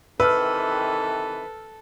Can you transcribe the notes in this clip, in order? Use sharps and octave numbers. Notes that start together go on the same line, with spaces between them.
C3 D#3 E3 A4 B4 E6 F6